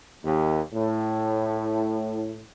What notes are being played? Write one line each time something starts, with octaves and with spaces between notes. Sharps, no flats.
D#2
A2